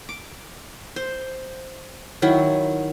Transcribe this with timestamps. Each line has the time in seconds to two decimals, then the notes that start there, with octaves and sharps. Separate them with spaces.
0.09 D6
0.96 C5
2.22 D#3 F#3 E4